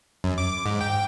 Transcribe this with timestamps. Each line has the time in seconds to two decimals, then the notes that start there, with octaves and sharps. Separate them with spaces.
0.24 F#2
0.38 D6
0.66 G#2
0.81 G5